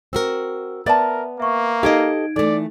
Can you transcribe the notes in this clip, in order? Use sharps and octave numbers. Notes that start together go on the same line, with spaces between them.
C4 F#4 A#4 E6
B3 A#4 D5 E5 A5
A#3 E5 C#6
D#4 G4 A4 D#5 F5 G#6 D7
E3 A3 D#4 A4 D5